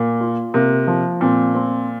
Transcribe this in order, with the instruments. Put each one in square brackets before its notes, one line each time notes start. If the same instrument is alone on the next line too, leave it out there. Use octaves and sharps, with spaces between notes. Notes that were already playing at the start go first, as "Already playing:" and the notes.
Already playing: [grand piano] A#2 [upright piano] A#3
[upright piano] F4
[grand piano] C3 [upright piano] A#3
[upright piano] F3
[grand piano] A#2 [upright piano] C4
[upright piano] C4